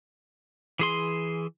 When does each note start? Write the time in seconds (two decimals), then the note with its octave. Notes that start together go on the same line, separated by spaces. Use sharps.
0.79 E3 G#4 C6